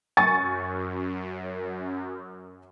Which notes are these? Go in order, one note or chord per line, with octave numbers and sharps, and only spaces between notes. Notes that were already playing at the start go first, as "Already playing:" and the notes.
F#2 G#5 C#6 A6